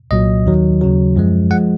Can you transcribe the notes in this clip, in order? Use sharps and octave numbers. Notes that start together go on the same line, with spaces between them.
C2 A#2 F#3 D#5
D#2 D#3 F#3
D#2 C#3 F#3
F#2 F3 G#3
F3 G#3 F#5